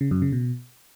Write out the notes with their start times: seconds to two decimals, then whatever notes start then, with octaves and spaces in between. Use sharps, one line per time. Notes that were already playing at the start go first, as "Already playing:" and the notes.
0.01 C#3
0.11 F#2
0.22 C#3
0.32 B2